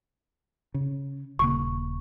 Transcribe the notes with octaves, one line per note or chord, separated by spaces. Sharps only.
C#3
D#1 C#3 A#3 C#6